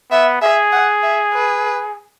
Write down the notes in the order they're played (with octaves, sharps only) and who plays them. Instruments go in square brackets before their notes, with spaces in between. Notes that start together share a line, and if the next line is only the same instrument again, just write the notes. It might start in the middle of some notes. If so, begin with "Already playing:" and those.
[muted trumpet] B3 [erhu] E5
[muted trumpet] G#4 [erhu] E5
[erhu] F#5
E5
B4